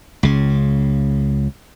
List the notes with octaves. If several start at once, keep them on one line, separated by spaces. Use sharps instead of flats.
C#2 C#3